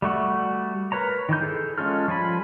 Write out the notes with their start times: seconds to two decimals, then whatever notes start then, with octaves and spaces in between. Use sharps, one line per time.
0.02 G3 A3 F#4
0.92 A#4 B4 C#5 A#5
1.29 D#3 E3 G6
1.42 G#4 A4
1.78 G#3 C#4 F4 A4 F6
2.08 F3 G3 G#5 B5